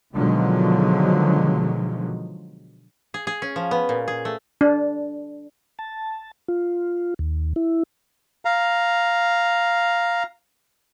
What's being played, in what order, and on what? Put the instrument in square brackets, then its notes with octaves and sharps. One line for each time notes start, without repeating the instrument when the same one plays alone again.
[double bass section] B2 D3 D#3 F3 F#3 G#3
[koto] G#4
G#4
C#4
F3
B3
A#2
G#4
A3
[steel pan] D4
[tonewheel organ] A5
F4
D#2
E4
[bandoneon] F5 A#5